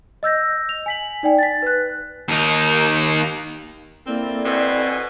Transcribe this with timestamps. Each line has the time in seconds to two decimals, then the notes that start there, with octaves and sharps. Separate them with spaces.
0.23 D#5 E6 G6 A#6
0.69 F7
0.86 G#5 B6 F#7
1.23 D#4 D5 G5 G#5
1.38 A6 B6
1.62 B4 F#6
2.28 D#2 D#4
4.07 A#3 C4 E4 A4 D5
4.45 B2 C4 G#5